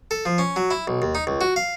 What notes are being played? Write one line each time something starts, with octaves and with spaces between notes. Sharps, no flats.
A4
F3
C#4
F#3
E4
B1
D#2
D#4
C#2
F#4
F5